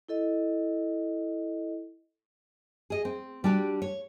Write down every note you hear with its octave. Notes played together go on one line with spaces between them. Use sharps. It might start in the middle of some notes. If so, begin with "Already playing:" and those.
E4 A4 D#5
G#4 D#5
C4
G3 D4 F#4 G4
C#5